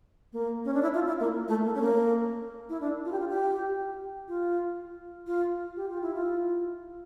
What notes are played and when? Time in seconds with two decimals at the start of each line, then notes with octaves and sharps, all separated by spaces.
0.33 A#3
0.65 C#4
0.74 D4
0.82 E4
0.94 F4
1.07 E4
1.20 A#3
1.48 A3
1.65 A#3
1.75 C#4
1.82 A#3
2.69 E4
2.80 D4
3.05 F4
3.12 G4
3.20 F4
3.29 G4
4.28 F4
5.27 F4
5.76 G4
5.89 F4
6.02 E4
6.14 F4